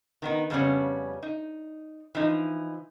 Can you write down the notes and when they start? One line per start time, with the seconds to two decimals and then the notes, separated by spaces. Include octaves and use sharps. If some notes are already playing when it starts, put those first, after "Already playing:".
0.22 D#3 B3 D#4
0.50 F2 C#3 G3 B3 C#4
1.22 D#4
2.15 E3 F3 D#4